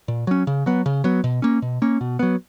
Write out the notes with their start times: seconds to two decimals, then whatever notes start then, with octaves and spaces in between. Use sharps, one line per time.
0.08 A#2
0.27 F#3 C#4
0.47 C#3
0.66 F#3 B3
0.86 C#3
1.04 F#3 B3
1.24 B2
1.42 A#3 C#4
1.62 B2
1.82 A#3 C#4
2.01 B2
2.19 F#3 B3